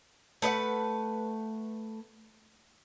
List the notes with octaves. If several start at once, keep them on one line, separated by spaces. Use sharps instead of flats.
A3 B4 D#5 F#5